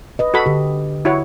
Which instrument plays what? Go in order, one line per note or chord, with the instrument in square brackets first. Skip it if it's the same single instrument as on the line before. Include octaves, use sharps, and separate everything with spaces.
[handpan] B4 D#5
[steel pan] F#4 A4 B5
[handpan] D3 G4
[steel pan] E4 F#4 C#5